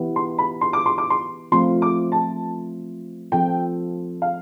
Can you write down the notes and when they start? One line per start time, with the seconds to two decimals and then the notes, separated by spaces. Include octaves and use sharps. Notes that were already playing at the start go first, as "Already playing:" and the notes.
Already playing: E3 B3 E4 G4
0.16 C6
0.38 B5
0.61 C6
0.73 D6
0.86 C6
0.98 D6
1.10 C6
1.52 F3 A3 C4 F4 C6
1.82 D6
2.12 A5
3.32 F3 C4 F4 A4 G5
4.22 F5